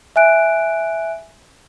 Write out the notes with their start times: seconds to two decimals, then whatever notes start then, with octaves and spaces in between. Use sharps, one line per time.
0.16 E5 G#5 F#6 D7